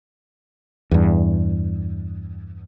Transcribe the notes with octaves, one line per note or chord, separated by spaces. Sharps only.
E2 G2